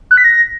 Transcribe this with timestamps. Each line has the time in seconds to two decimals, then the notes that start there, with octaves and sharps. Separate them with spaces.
0.11 F#6
0.18 B6
0.24 A#6